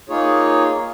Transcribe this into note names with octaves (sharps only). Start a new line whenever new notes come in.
A#3 D#4 F4 G#4 C#5